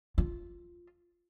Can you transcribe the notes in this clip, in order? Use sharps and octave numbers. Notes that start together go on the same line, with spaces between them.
F4